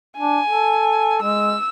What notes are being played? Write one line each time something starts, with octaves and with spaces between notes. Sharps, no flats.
D4 G#5
A4
G#3 E6